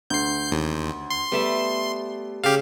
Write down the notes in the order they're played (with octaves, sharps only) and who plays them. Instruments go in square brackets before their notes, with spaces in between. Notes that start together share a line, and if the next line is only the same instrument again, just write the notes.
[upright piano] D2 [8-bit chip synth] G6 C7
[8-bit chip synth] D#2
C6
[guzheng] G3 A3 E5 [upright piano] B3
[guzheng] C#3 [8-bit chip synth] G4 F5